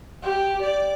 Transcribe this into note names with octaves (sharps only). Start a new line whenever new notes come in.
G4
D5